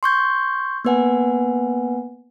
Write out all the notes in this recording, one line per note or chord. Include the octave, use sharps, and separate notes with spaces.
C6 C#6 G6 G#6
A#3 B3 B4 F#5 G#5